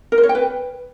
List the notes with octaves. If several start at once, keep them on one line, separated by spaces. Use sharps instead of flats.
A#4
C5
C#5
G5
B4